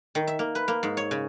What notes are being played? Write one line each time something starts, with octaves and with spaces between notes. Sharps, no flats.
D#3
E5
A#3
B4
A#3
G#2
C#5
C#3